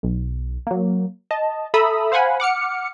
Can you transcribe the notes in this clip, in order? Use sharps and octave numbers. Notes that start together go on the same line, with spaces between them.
B1
F#3 A#3
D#5 A5
A4 E5 A#5 B5 D#6 E6
C5 F5 F#5 G#5 B5
F#5 D6 F6 C#7